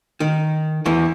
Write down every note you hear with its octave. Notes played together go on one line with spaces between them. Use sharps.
D#3
E2 E3